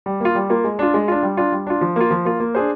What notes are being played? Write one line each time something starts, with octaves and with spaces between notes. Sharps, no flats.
G3
A#3 F4
G3
A#3 F4
G#3
D4 F4
G#3
D4 F4
G3
D4 F4
G3
D4 F4
F3
A#3 F4
F3
A#3 F4
A#3
D4 G#4 C5